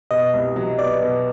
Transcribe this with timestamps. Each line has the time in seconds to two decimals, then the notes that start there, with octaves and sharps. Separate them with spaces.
0.11 B2 D#5
0.34 C2
0.56 F#3
0.78 B3 D5
1.02 B2